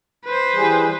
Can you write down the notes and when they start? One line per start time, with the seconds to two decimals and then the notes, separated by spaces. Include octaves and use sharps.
0.25 B4 C5
0.55 E3 G3 G#4